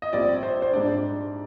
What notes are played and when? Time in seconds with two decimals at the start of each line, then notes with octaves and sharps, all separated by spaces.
0.02 D#5
0.13 A#1 A#2 G3 C4 D5
0.43 C5
0.62 C5
0.73 G#2 G3 D4 D5